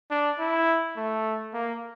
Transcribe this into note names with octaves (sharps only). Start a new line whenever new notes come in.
D4
E4
A3
A#3